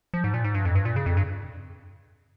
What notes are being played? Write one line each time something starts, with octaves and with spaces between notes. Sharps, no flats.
F3
G#2
A#2
G#2
G2
F2
G2
A#2
C#3
F2
G2